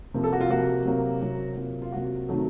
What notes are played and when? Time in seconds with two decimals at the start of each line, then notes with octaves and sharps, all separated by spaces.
0.14 C3 F3 A#3
0.24 A4
0.33 F#4
0.41 F4
0.49 C3 F3 A#3 F#4
0.85 C3 F#3 A#3
1.21 C3 F#3 A#3
1.57 C3 F#3 A#3 F4
1.82 F4
1.92 C3 F#3 A#3 F#4
2.29 C3 D#3 F#3 A3